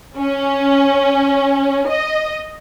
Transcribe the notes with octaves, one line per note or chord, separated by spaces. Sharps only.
C#4
D#5